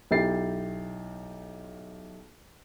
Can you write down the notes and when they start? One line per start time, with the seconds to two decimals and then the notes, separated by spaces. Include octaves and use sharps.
0.11 B1 E4 G4 A6 C7